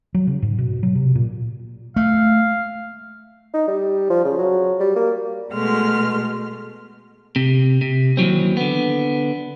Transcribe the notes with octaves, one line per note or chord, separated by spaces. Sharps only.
F#3
C#3
G#2
B2
F#3
C3
A#2
A3 F5
D#4
G3
F3
C#3
F#3
G3
A#3
B2 G#3 A3 C6 F6
C3
C3
D#2 E3 F#3 C4
D3 B3